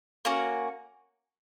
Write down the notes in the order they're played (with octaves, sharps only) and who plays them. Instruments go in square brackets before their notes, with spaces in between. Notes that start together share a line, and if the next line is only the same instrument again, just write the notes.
[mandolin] A#3 C#4 F#4